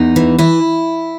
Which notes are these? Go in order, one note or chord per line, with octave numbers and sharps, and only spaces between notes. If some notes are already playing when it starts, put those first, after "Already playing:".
Already playing: E2 D#4
E3
E3 E4